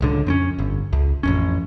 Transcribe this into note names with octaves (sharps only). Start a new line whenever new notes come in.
D1 C#2 D3
F2 C4 C#4
G1
C#2
A1 F2 C#4